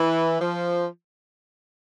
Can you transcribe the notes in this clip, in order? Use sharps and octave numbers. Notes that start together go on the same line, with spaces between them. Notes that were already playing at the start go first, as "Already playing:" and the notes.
Already playing: E3
F3